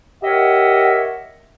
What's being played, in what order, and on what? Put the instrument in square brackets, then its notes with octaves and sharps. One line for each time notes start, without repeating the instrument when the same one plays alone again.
[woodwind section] G4 A#4 C#5 D#5 E5 F#5